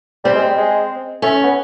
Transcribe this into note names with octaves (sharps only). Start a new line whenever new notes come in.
G3 C4
G#3
G3
G#3
A3 C#4
B3